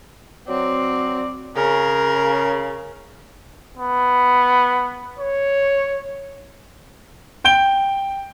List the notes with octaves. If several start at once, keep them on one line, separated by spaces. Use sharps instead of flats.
F#3 C4 D5
C#3 A#4
B3
C#5
G5 G6 D7 G7